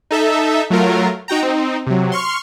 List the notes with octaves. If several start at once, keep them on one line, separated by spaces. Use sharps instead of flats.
D#4 A4 E5
F#3 A3 F4 A#4
D#4 F#4 G5 A#5
C4 D#4
C3 F#3
C6 C#6 F6